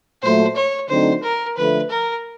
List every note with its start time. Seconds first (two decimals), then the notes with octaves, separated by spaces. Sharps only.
0.22 A#2 F#3 A3 C5
0.56 C#5
0.89 D3 F#3 A3 C4 D#4 C5
1.23 A#4
1.57 D3 F3 A3 B4
1.90 A#4